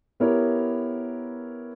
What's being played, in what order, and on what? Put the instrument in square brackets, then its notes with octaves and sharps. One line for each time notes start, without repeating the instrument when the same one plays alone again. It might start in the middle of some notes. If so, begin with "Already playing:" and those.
[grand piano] B3 E4 G4 A#4 C#5